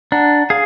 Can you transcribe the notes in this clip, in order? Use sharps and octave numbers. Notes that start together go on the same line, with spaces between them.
D4 F#5 A#5
G#4 F5 G#5